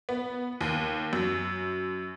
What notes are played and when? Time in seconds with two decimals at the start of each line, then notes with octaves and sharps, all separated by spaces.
0.09 B3
0.61 D#2
1.13 F#2